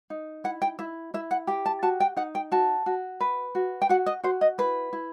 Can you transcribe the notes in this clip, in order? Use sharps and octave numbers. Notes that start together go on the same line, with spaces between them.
D#4
E4 F#5
G5
E4 E5
E4 E5
F#5
G4 G5
A5
F#4 A5
G5
D#4 F#5
G5
F#4 A5
F#4
B4
F#4
G5
F#4 F#5
D#5
F#4 C5
D#5
E4 B4
E4